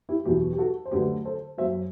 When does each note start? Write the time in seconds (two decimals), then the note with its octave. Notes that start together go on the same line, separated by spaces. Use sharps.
0.09 E4 G4
0.25 E2 B2 F#3 E4 G4
0.53 G4
0.58 F#4 A4
0.86 C5
0.91 D2 D3 F#3 G4 B4
1.25 A4 C5
1.58 F#2 F#3 C5 E5